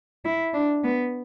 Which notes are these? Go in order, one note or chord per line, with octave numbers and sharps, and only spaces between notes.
E4
D4
B3